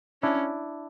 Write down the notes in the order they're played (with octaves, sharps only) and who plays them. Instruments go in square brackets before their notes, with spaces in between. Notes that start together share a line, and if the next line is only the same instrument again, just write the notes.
[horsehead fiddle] C#4 [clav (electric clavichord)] D4 E4